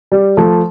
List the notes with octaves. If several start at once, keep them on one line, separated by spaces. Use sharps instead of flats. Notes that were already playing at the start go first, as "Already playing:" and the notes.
G3
F3 A3